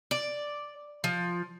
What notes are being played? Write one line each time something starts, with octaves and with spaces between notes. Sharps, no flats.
D5
F3